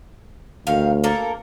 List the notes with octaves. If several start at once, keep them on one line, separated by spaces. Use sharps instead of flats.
D2 D#3 F5
A#3 A4 A#4